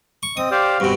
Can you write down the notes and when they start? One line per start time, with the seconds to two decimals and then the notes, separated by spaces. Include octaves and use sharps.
0.23 C#6
0.37 C4 D#5 D#6
0.51 G4 C5 D5 F5
0.80 G2 B2 C4 F#4